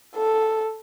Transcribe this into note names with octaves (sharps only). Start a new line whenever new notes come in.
A4